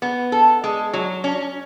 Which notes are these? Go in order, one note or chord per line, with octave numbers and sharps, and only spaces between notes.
B3
A4
G#3
F#3
C#4